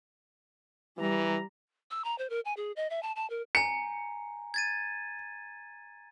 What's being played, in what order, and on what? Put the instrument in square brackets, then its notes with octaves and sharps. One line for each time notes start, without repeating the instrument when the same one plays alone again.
[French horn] E3 [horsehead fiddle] G3 A#5
[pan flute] E6
A#5
C5
A#4
G#5
G#4
D#5
E5
A5
A5
A#4
[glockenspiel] G#5 A#5 [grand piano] C#7
[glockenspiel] G#6 A6 D#7